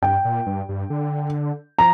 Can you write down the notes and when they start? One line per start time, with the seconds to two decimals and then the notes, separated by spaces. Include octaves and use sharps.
0.02 G2 G5
0.25 A#2
0.46 G2
0.69 G2
0.90 D3
1.79 F3 A#5